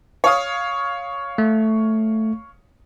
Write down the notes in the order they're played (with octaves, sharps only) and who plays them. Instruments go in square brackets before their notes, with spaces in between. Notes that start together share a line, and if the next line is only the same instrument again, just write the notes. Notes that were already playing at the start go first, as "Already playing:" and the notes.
[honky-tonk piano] C#5 F5 D#6
[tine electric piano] A3